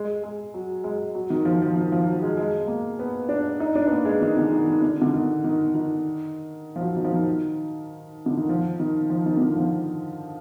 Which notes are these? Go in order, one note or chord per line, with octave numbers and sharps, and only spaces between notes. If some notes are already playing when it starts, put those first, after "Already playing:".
Already playing: G#3
G#3
F#3
G#3
F#3
D#3
F3
F3
D#3
F3
F#3
G#3
G#3
G#3
A#3
B3
D4
D#4
D4
B3
A#3
G#3
D#3
D3
D#3
D#3
D3
D3
D#3
D#3
D#3
F3
F#3
D#3
F3
D#3
D3
D#3
F3
D#3
F3
D#3
D3
D#3
F3